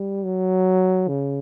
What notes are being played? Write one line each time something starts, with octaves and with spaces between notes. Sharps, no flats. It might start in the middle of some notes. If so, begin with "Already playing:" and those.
Already playing: G3
F#3
C#3